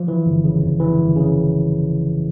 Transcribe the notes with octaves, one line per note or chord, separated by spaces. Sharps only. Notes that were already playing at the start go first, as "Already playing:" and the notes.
Already playing: F3
E3
G1
C#3
F2
E3
G1
C#3